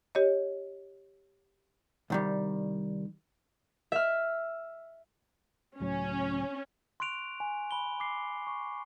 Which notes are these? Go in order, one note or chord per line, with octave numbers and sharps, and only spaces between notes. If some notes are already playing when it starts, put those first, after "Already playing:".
G4 C#5 D#5
C2 D#3 G3
E5 F6
C#2 A2 F#3 C#4
C6 C#6 F#6 D7 F7
G#5
B5 G7
D6 C7
C#6